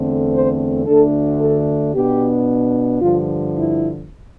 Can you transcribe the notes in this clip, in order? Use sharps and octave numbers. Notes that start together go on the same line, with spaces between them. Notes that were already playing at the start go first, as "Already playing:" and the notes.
Already playing: E2 D3 A3 C4
C5
D2 D3 A3 D4 A4
A4
B2 B3 D4 G4
G2 D3 F3 F4
E4